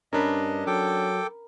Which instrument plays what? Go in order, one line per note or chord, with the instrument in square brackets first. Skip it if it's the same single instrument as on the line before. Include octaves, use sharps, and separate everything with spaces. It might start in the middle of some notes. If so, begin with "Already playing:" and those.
[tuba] G2 [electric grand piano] C#4 D4 [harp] A#4 B4 [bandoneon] D#5
[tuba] F#3 [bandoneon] A4 G5 D6